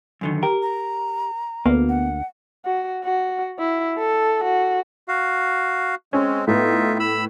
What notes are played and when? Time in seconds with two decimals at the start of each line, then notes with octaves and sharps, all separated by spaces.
0.21 F#2 D3 D#3
0.43 G4 A#4
0.62 A#5
1.66 D2 A#3 B3
1.89 F#5
2.66 F#4
3.04 F#4
3.59 E4
3.99 A4
4.44 F#4
5.08 F#4 F5
6.13 G#3 C4 C#4
6.47 A2 B3 D#4 F4 E5
7.00 B5 E6